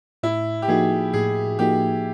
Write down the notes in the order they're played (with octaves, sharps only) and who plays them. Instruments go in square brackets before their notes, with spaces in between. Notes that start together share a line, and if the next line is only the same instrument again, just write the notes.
[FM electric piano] A2 [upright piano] E4
[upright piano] G4
[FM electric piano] F3 A#3 D#4 F#4 [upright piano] G#4
[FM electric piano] A2 [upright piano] G#4
[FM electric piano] F3 A#3 D#4 F#4 [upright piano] G4